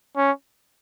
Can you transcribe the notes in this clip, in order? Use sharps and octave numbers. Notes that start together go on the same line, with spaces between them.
C#4